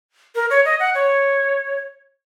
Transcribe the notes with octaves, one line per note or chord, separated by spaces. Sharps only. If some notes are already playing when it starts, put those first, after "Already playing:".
A#4
C#5
D#5
F#5
C#5